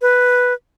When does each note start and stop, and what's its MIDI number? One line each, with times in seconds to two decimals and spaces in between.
0.02 0.54 71